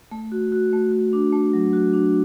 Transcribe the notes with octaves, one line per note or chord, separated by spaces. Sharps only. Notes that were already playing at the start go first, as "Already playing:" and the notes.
A3
F#4
F#4
A3
F#4
D4
A3
F#3
F#4
D4